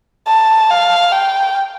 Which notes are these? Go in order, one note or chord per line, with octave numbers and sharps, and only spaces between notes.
A5
F5
G5